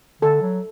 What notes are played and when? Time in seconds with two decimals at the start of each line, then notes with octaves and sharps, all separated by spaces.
0.22 D3 A4
0.42 F#3